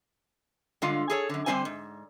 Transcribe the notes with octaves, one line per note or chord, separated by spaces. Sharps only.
G2 D3 G#3 F4 F5
G#4 A4 C#5
F#2 D3
D3 G3 C4 E4 C5 G#5
G#2